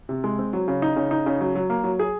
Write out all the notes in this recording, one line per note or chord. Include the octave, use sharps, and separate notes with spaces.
C3
G#3
C4
F#3
C#3
D#4
C#3
D#4
C#3
F#3
F#3
A#3
F#3
G#4